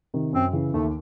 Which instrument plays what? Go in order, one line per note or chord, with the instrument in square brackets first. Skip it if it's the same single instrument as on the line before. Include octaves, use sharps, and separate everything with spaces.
[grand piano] C3 D#3
[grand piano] F#2 [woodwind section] C4
[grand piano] C#3 E3
[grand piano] D#2 [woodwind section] A3